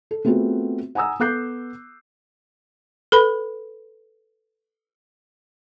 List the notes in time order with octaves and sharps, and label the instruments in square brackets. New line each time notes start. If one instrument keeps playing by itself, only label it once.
[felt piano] A4
A3 B3 C4 F4 F#4 G#4
F#5 G#5 A#5 D#6 E6
B3 A4 D6 F#6 G6 C7
[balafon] A4 B4 B5